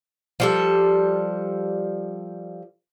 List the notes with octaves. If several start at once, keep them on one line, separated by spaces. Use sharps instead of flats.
F3 G3 A4